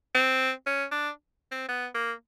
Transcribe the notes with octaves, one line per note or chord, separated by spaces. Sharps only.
C4
C#4
D4
C4
B3
A#3